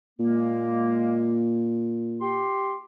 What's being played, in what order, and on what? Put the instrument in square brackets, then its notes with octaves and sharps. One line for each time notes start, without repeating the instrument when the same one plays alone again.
[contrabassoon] A#2 [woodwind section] G#3 A#3
[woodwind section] G4 C6